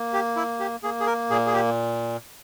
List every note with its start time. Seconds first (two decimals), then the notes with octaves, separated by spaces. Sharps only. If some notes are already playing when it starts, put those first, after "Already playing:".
Already playing: A#3
0.13 G4
0.36 E4
0.60 G4
0.83 A#3 G#4
1.00 G#4
1.06 A#4
1.30 A#2 G#4
1.46 G#4
1.54 G4